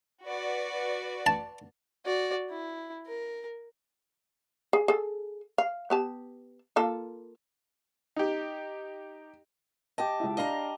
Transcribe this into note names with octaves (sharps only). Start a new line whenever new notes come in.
F#4 B4 D5
A5
F#4 D5
E4
A#4
G#4
G#4 A4
F5
B3 G4 A5
A#3 F4 A4
D#4 G4
G4 D#5 A5
C#2 E4
D4 D#5 F5 A#5